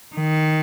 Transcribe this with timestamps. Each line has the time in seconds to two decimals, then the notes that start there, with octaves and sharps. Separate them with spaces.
0.16 D#3